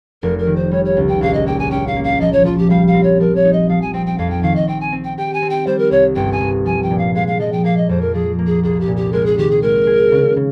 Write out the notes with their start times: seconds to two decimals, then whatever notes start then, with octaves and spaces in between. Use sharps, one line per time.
0.22 F1 A#4
0.39 A#4
0.47 D#3
0.56 C5
0.71 G3 C#5
0.85 C#5
0.97 C#2
1.09 G5
1.21 A#1 F5
1.33 D#5
1.46 A#3 G5
1.59 G#5
1.71 C#4 G5
1.87 F5
1.96 A#3
2.04 F5
2.20 F3 D#5
2.32 C#5
2.45 F3 F4
2.58 G4
2.70 G3 F5
2.87 F5
2.94 C4
3.03 C#5
3.20 F3 A#4
3.35 C#5
3.44 D#4
3.52 D#5
3.69 F3 F5
3.81 G#5
3.93 C4 G5
4.06 G5
4.18 F2 F5
4.30 G5
4.43 D#3 F5
4.55 D#5
4.67 C4 G5
4.80 G#5
4.92 C4
5.04 G5
5.17 G4 G5
5.34 G#5
5.42 C4
5.50 G5
5.67 G3 C5
5.78 A#4
5.91 C2 C#5
6.16 G1 G5
6.32 G#5
6.41 G1
6.65 F3 G#5
6.82 G5
6.91 A#2
6.98 F5
7.15 G#3 F5
7.27 F5
7.40 F3 D#5
7.52 G5
7.64 A#3 F5
7.77 D#5
7.89 F2 C5
8.01 A#4
8.14 F3 G#4
8.39 A#3
8.47 G#4
8.63 C2 G#4
8.80 G4
8.88 A#2
8.96 G4
9.12 G#3 A#4
9.26 G#4
9.38 D#3 G4
9.50 G#4
9.62 G#3 A#4
9.87 G#4
10.12 C#3
10.36 C#3